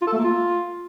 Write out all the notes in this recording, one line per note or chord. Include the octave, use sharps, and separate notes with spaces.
F4
A4
A3
A#3
F4